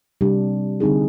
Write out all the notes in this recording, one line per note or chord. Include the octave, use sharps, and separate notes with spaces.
C3 G3 D4 G4
D3 G3 C4 D#4 G#4